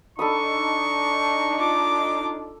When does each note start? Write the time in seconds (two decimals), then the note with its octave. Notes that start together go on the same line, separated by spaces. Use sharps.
0.19 D4 D#4 A4 B5 C#6 D#6
1.58 F4 D6